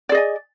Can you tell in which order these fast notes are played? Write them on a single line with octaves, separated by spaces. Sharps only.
D5 G#4 D#5 G#5